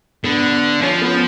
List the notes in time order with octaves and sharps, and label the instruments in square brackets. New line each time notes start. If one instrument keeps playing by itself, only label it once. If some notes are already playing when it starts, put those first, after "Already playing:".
[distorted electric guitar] D3 [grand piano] B3
[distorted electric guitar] F3 [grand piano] C#4
[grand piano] B3